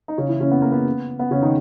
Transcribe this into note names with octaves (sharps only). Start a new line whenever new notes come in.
D#4
C#3 C#4
E3 E4
C#3 C#4
B3
A#3
B3
B3
C#3 C#4
D#3 D#4